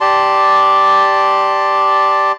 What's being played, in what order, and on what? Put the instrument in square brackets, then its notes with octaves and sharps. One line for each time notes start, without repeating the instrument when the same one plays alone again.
[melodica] G4 D5 A5 C6